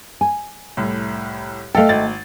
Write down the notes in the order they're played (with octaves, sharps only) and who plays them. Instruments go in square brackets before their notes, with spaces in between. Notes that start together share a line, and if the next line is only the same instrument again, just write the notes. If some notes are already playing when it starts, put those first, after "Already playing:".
[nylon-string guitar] G#5
[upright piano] C2 A2
[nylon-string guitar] A3 D#5 G5 [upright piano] A4 F5
[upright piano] G#1 A6